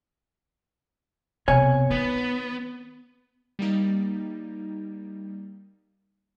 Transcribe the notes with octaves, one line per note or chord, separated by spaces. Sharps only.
B1 C3 C#5 G#5
D#3 B3
G3 A#3 D#4